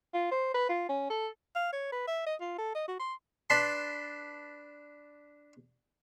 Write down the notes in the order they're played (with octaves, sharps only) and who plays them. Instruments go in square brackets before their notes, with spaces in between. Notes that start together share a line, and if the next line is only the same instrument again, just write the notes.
[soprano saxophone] F4
C5
B4
F4
C#4
A4
F5
C#5
B4
E5
D#5
F4
A4
D#5
F#4
C6
[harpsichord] D4 B4 A5 B5 C6